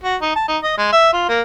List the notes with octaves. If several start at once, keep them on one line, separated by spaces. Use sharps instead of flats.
F#4
D#4
A5
D#4
D#5
G#3
E5
F4
A#3